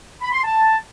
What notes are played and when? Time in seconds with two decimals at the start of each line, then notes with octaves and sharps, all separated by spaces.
0.21 B5
0.33 C6
0.44 A5